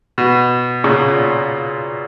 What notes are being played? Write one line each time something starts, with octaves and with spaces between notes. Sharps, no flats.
B2
A#2 C#3